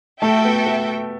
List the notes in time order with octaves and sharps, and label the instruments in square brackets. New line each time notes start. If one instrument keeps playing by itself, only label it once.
[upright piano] A3 [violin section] F#4 A4 E5 G5
[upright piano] B3
B3